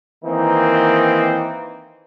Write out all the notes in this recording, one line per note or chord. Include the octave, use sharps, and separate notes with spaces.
D#3 E3 A#3 C4 D#4